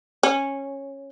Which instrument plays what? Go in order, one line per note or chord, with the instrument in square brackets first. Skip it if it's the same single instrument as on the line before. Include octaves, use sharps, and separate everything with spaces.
[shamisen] C#4